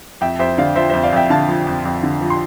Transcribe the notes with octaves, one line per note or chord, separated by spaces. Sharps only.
F2 E5 G5
F2 C5 E5
D3 D5 F5
F3 C5 E5
F2 C5 E5
D5 F5
F2 E5 G5
D3 F5 A5
F3
F2
F2
D3
F3
C6